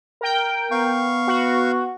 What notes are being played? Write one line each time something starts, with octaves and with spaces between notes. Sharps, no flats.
A#4 G5
B3 F5 C#6
F#4